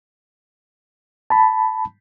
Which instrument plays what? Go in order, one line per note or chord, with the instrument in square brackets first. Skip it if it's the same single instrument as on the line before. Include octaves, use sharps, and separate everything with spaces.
[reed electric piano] A5 B5